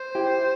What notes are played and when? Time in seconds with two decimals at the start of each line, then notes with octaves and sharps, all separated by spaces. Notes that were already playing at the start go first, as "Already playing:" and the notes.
Already playing: C5
0.15 E4 G4